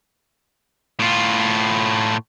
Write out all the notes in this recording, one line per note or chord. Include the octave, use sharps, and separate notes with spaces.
A2 F4